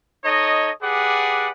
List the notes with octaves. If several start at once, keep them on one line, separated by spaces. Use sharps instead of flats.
D#4 A4 C#5 D#5
G4 G#4 B4 D5 F#5